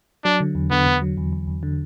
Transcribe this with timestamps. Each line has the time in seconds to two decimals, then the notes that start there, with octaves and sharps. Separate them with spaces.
0.25 F#3 D4
0.40 D3
0.55 E2
0.71 D3 B3
0.87 D3
1.02 F#3
1.17 E2
1.33 E2
1.48 E2
1.63 D3